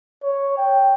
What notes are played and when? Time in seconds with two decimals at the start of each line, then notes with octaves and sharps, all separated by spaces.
0.24 C#5
0.58 G5